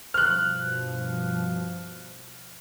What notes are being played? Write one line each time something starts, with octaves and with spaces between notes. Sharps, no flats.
G2 B2 F3 F6 F#6